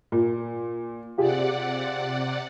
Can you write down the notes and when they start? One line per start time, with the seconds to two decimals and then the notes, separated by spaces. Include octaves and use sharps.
0.12 A#2
1.18 C3 F4 G4 G#4 D5 F#5